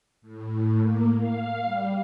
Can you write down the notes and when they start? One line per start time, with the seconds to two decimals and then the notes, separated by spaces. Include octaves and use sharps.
0.22 A2
0.81 A#3
1.17 F5
1.64 G3